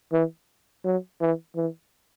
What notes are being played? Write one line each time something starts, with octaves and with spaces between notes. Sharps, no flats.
E3
F#3
E3
E3